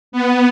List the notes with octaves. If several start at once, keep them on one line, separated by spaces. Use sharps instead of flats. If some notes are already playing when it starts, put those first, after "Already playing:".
B3